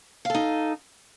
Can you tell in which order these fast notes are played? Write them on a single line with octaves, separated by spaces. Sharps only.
F5 A4 D#4